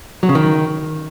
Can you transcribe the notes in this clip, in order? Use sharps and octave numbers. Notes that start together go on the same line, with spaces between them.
F#3
C#3
D#3